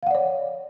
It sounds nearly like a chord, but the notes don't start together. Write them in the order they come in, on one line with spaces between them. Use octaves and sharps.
F5 F#5 D5 C#5